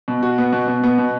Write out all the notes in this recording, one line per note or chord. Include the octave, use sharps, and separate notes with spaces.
B2
F#4
B3
B2
B2
B3
B2